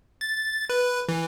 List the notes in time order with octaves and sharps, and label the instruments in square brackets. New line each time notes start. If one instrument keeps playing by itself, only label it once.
[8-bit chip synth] A6
B4
E3